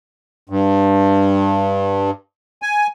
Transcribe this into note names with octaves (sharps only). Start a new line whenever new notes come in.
G2
G#5